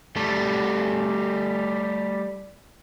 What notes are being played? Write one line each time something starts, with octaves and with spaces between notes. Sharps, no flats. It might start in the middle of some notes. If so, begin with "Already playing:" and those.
G3 A3